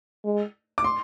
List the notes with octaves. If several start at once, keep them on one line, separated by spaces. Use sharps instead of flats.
G#3
D6
C6